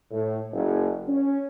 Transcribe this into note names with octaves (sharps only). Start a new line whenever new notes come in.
A2
F#1
C#4